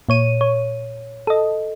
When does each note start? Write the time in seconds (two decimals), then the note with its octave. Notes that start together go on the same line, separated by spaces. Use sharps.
0.09 A#2 C#5 D#7
0.41 C#5
1.27 A4 D#5